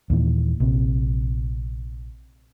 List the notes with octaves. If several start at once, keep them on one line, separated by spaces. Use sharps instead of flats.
D#2 A#2 E3
A#1 C3